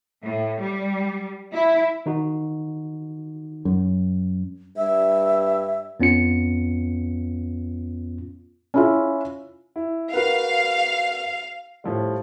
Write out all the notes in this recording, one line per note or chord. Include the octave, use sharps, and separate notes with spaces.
A2
G3
E4
D#3 D#4 F#4
F#2
G2 E5
F2 B3 C#4 F4 C#7
C#4 E4 F4
E4
F#4 A#4 B4 F5
A2 F3 G3